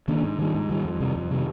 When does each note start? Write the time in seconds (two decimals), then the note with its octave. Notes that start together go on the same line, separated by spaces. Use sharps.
0.08 D#3 A#3 D4
0.23 G#2
0.39 D#3 G3
0.54 G#2
0.69 D#3 G3
0.85 F2
1.00 C3 D#3 G3
1.15 F2
1.31 C3 D#3 G3